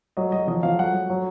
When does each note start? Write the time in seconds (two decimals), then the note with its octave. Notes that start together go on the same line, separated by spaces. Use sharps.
0.17 F#3 D#5
0.32 F#3 D#5
0.48 F3 D#5
0.63 F3 F5
0.79 F#3 F#5
0.94 F#3
1.10 F#3